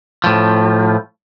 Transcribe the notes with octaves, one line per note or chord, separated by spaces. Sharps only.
A2 F3